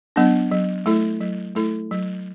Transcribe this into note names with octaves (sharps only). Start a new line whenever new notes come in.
F#3 B3 D4
F#3
A3 E4 A4
F#3
A3 E4 A4
F#3